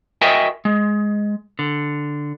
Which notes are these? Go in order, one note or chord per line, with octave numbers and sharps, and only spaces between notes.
F#4 A#4 D#5 E5 G5 G#5
G#3
D3